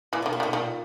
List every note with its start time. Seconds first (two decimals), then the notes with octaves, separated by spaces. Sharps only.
0.13 A#2 E3
0.22 B2
0.26 D#3
0.33 A#2
0.40 D#3
0.43 B2
0.53 A#2 D#3